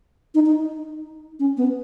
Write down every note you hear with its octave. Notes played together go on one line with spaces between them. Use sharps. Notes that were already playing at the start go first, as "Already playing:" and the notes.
D#4
D#4
C#4
B3